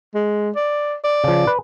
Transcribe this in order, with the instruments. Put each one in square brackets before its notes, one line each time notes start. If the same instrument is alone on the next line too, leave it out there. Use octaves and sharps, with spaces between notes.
[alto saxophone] G#3
D5
D5
[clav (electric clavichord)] C#3 F3
B4